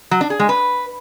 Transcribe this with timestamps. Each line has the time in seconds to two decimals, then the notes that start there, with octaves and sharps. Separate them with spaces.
0.11 F#3
0.21 D4
0.30 G#4
0.40 G#3
0.49 B4